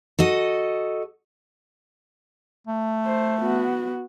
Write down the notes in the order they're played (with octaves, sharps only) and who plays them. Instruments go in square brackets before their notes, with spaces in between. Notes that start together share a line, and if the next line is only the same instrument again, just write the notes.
[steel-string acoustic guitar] F#4 A4 D#5
[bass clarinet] A3
[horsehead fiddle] C5
B3 F#4